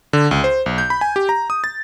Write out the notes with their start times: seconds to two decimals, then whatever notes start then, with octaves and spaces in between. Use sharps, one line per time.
0.13 D3
0.31 C#2
0.44 C5
0.66 B1
0.78 G6
0.90 B5
1.01 G#5
1.16 G4
1.29 A#5
1.50 D#6
1.64 A6